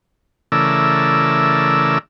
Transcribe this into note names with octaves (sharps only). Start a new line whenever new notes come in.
C#3 E3 A3 A#4 D5 E6